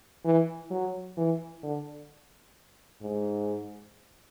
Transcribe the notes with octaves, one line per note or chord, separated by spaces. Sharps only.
E3
F#3
E3
D3
G#2